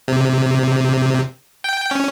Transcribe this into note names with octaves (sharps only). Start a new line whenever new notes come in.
C3
G5
C#4